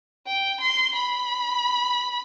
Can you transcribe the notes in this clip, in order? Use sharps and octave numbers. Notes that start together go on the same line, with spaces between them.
G5
C6
B5